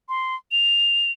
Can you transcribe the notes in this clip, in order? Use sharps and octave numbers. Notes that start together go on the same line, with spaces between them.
C6
F7